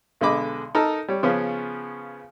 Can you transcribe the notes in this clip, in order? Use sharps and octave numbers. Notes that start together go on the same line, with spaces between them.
B1 D3 G#3 D#5 B5 D6
D#4 A4 A#4 D#5
G3 C#5
C#3 F3 B3 C#4